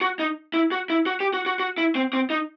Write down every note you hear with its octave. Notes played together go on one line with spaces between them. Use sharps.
F#4
D#4
E4
F#4
E4
F#4
G4
F#4
F#4
F#4
E4
C4
C4
D#4